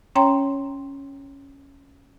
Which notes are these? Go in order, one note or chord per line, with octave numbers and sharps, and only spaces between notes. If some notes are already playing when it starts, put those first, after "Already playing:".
C#4 C#5 G5 A#5 C6